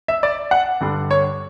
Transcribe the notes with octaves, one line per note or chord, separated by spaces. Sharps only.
E5
D5
F#5
G2 D3 G3
C#5